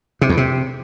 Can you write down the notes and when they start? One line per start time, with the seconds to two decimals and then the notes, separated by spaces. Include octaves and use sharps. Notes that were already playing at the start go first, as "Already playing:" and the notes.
0.21 C3
0.29 E2
0.37 C3